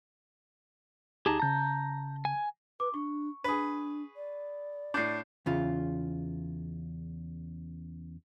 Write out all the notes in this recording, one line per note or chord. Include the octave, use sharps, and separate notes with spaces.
D2 D#4 G4 G#4 A5 A#5
C#3 A5 A#5 G6
G#5
B4 D6
D4 C#6
D4 G#4 B4
D5
A2 D4 G6 C7
E2 C#3 F4